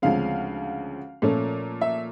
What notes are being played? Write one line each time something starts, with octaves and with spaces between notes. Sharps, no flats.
D2 C#3 F3 G#3 C4 F5
A#2 F3 A3 C#4
E5